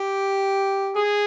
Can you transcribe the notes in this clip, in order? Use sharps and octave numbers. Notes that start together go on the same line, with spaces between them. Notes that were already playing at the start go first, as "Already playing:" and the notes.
Already playing: G4
G#4